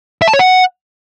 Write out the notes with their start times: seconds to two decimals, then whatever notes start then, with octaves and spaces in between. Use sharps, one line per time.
0.22 E5
0.28 A5
0.33 C#5
0.39 F#5